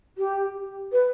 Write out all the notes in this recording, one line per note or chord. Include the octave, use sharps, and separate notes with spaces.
G4
B4